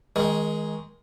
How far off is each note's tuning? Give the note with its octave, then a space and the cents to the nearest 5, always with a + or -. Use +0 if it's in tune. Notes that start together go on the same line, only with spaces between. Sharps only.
D#3 +30 G#3 +0